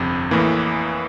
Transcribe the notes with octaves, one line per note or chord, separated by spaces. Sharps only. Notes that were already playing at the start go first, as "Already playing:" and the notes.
Already playing: G1 F2 C3
A1 A2 E3 A#3